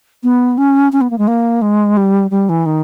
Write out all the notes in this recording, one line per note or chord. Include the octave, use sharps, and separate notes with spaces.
B3
C#4
C#4
B3
A#3
G#3
A#3
G#3
G3
G3
E3
D#3